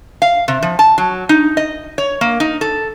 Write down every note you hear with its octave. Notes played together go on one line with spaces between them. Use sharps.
F5
C3
F3
A5
F#3
D#4
D#5
C#5
A#3
D#4
A4